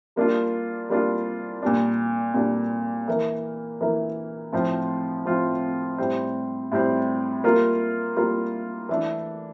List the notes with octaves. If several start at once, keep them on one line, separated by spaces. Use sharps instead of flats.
G3 A#3 D4 F4
G3 A#3 D4 F4
A#2 G3 D4
A#2 G3 D4
E3 A#3 E4 A#4
E3 A#3 E4 A#4
A2 F3 C4 F4
A2 F3 C4 F4
A2 G3 C4
A2 G3 C4
G3 A#3 F4 A#4
G3 A#3 F4 A#4
E3 A3 D4